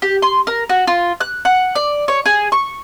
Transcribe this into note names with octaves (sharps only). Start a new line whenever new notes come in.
G4
C6
A#4
F#4
F4
F#6
F#5
D5
C#5
G#4
C#6